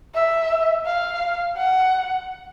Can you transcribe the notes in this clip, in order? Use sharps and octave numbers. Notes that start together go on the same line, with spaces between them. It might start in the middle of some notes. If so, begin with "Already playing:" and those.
E5
F5
F#5